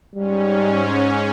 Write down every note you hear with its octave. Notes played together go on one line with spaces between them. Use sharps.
G#2 G3 C#4